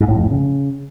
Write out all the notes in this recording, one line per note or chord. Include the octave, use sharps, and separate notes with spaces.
G#2
A2
F2
A2
C#3